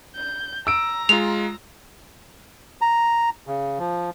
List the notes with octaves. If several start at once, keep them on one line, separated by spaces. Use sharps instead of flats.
G6
A#5 E6 D7
G#3 F4 F7
A#5
C#3
F3